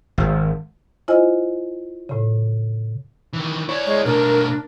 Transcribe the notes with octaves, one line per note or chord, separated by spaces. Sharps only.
G#1
E4 F4 C5 D#5 G#5
A2 C#3
D#3 E3
E4 C#5 D5
G#3
B2 A3 D4 A#4